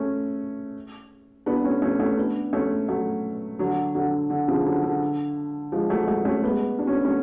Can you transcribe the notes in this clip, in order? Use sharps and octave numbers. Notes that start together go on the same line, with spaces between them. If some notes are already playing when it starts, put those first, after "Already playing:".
Already playing: A3 C#4
B3 D4
A3 C#4
A3 C#4
A3 C#4
B3 D4
A3 C#4
F#3 A3
D3 F#3
D3 F#3
D3
C#3 F3
D3 F#3
D3
F3 G#3
F#3 A3
G#3
F#3 A3
A3 C#4
G#3 B3
D4
C#4
B3
A3 C#4